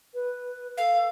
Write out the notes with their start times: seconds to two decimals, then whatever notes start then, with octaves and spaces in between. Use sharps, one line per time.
0.14 B4
0.77 A4 F5